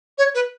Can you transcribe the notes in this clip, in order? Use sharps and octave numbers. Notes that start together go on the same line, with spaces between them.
C#5
B4